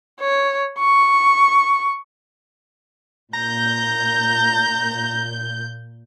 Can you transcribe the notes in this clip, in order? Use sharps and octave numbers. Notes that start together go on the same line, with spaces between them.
C#5
C#6
A#2 A#5 G6